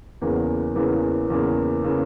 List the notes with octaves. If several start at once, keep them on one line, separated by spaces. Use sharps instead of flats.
E2 C#3 E3 A#3
E2 C#3 E3 A#3
E2 C#3 E3 A#3
C#3 E3 A#3